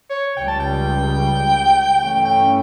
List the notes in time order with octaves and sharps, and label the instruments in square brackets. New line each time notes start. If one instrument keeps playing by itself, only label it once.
[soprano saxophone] C#5
[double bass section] C#2 C#3 G3 [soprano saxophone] G5
[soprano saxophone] A5
G5
[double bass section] G2 E3 A3 C#4 [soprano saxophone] G5
[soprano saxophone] G5